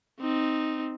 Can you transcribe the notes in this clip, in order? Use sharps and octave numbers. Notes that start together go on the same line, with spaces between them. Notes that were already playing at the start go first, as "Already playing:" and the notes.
C4 D#4